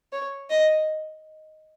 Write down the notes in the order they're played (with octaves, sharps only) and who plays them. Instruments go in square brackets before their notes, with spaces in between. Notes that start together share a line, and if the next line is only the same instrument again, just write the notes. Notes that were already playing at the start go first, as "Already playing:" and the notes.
[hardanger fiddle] C#5
D#5